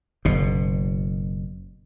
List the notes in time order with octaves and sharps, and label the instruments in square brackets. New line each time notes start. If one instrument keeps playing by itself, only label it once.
[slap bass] F#1 B2